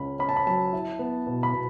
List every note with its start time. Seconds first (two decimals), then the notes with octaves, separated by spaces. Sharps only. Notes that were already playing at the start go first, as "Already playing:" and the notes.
Already playing: C#2 C#4 B5
0.19 C#4 B5
0.29 A5
0.36 B5
0.47 F#3 A5
0.73 E4
0.99 B3
1.27 B2
1.43 B5
1.53 B2